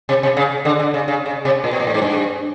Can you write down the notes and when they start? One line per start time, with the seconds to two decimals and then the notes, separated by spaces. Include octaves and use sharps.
0.09 C3
0.23 C3
0.37 C#3
0.65 D3
0.79 D3
0.94 C#3
1.08 C#3
1.26 C#3
1.45 C3
1.64 A#2
1.73 B2
1.80 A#2
1.87 A2
1.94 G#2
2.02 G2